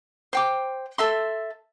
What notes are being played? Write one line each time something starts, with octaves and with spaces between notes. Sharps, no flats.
C5 G5 D6
A4 E5 C6